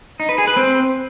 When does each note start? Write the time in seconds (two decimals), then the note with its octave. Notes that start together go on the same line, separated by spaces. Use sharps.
0.20 D#4
0.29 B4
0.38 G#4
0.47 B4
0.57 C4